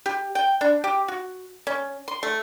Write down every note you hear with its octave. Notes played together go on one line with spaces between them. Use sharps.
G4
G5
D4
G4
F#4
C#4
C6
A3